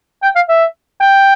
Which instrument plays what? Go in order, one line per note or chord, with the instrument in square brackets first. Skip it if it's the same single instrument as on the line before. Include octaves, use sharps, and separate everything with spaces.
[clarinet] G5
F5
E5
G5